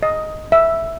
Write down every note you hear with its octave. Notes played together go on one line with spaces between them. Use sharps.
D#5
E5